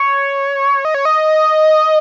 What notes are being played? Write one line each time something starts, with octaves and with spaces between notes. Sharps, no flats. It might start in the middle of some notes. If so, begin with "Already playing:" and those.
Already playing: C#5
D#5
C#5
D#5